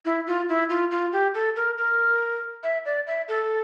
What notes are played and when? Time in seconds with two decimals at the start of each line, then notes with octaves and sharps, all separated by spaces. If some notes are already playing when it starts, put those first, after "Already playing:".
0.05 E4
0.27 F4
0.49 E4
0.70 F4
0.91 F4
1.13 G4
1.34 A4
1.56 A#4
1.78 A#4
2.63 E5
2.86 D5
3.07 E5
3.28 A4